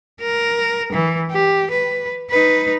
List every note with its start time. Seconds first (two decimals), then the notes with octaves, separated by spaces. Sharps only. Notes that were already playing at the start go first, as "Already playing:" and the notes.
0.21 A#4
0.92 E3
1.31 G4
1.71 B4
2.31 D#4 B4